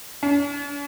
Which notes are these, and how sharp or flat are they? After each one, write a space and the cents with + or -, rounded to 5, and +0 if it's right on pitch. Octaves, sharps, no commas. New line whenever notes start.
C#4 +45